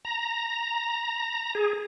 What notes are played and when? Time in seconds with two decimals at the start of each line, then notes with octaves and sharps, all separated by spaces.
0.05 A#5
1.55 G#4